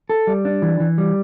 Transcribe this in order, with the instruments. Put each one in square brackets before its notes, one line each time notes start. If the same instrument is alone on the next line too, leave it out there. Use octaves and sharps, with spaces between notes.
[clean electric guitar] A4
G3
D4
E3
E3
G3